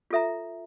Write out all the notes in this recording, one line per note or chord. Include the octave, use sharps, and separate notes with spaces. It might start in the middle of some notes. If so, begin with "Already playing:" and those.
F4 A4 E5 A#5